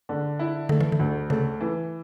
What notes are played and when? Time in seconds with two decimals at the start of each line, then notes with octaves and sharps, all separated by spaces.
0.09 D3
0.39 E4
0.69 D3 A3
0.81 E3
0.92 D3
1.00 D2
1.30 C#3 A3
1.61 E3